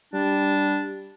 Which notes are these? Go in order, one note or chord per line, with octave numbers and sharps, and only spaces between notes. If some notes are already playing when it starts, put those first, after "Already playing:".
G3 D4